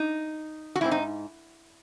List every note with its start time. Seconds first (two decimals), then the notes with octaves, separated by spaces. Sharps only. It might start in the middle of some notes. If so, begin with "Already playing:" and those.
Already playing: D#4
0.76 F#4
0.81 G#2 F#3 C4 E4
0.91 D#4